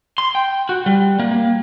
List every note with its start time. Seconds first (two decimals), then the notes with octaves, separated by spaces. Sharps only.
0.18 C6
0.35 G5
0.69 F#4
0.86 G3
1.19 A#3
1.31 A#3